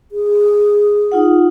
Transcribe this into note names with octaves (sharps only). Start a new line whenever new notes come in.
G#4
D#4 F4 F#5